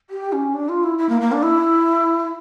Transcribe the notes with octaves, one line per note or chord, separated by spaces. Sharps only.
G4
C#4
D4
F4
E4
E4
A#3
A#3
D4
E4